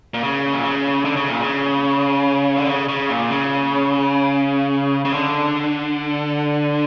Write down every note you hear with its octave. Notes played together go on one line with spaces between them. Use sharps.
A#2
C#3
A#2
C#3
D3
C#3
A#2
C#3
D3
C#3
C#3
A#2
C#3
C#3
D3